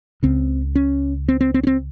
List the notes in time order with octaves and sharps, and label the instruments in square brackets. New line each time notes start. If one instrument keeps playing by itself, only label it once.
[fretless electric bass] C#2 C#3 C4
C#4
C4
C4
C4
C#4
C4